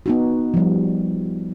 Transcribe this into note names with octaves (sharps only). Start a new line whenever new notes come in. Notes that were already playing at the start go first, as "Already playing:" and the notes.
B3 D#4 F#4
F3 G3